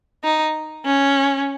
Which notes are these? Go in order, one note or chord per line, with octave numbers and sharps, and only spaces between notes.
D#4
C#4